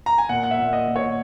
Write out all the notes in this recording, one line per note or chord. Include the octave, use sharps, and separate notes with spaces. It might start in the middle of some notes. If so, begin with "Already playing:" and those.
A#5
G#5
A#2 F#5
F#5
E5
A#2
D#5
A#2
C#5